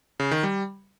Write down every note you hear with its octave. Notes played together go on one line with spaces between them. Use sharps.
C#3
D#3
G3